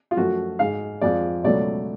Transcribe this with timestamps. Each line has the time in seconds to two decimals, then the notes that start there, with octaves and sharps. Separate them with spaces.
0.11 F4
0.17 F#2 F3 A3 F#4
0.59 G#2 G#3 F5
1.01 F2 F3 G#3 D5
1.43 C#2 B2 F#3 A3 D5